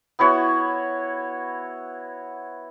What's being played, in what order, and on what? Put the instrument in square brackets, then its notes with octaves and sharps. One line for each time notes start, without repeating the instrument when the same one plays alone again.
[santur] B3 E4 F#4 C#5